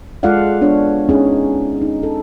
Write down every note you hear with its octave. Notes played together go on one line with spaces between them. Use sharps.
G#3 F4 A4 D5 F5 F#5
B3 D4 C#5
C#4 D#4 G#4
D#4
A4